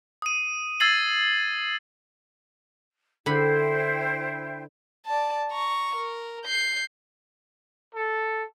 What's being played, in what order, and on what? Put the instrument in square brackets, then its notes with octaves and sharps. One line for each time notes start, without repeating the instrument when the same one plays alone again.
[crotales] D#6 D#7
E6 G#6 A6 C7 F#7
[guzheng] D3 B5 [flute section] E4 C5 G5
[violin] D5 A5
A#5 C#6
A#4
G6 C7
[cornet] A4